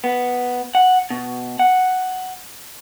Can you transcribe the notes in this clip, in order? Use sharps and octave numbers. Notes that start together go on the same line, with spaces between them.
B3
F#5
B2
F#5